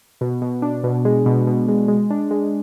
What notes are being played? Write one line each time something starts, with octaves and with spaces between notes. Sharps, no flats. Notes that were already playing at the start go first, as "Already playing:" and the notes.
B2
B2
D4
B2
G#3
B2
B2
G#3
G#3
D4
G#3